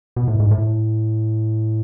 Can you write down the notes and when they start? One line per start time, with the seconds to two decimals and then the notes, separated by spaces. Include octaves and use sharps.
0.16 B2
0.28 A2
0.40 G#2
0.51 A2